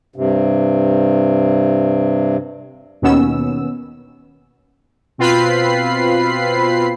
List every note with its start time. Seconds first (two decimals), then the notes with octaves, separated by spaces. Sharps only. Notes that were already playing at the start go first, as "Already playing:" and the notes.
0.16 G2 C3
3.02 D#2 B2 D#3 B3 C#4 E6
5.18 B2 C4 F4 B4 B5 C7